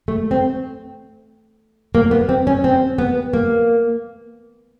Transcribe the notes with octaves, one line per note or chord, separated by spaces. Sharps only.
A3
C4
A#3
B3
C4
C#4
C4
B3
A#3